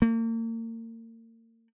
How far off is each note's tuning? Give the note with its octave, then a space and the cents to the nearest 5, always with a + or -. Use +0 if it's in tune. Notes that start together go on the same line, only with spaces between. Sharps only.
A#3 -40